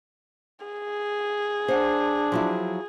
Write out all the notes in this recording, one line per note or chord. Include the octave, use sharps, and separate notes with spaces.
G#4
D4 C5 F#5
F3 F#3 E4